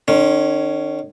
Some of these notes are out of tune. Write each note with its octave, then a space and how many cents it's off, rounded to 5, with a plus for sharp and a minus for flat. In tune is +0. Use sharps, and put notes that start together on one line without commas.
D#3 -40 C#4 +0